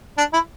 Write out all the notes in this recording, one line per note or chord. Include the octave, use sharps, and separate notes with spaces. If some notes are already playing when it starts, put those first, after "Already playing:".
D4
E4